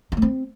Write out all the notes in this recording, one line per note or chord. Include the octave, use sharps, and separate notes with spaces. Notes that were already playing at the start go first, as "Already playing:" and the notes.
D#4
A3
C4